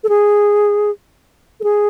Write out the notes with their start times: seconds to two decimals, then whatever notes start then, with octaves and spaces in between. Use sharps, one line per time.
0.04 A4
0.09 G#4
1.60 A4
1.64 G#4